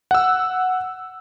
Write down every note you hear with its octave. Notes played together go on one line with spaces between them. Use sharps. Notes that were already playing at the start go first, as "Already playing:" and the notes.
F#5 E6